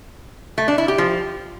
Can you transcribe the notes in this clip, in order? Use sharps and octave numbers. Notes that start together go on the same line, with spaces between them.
A3
D4
E4
G4
F3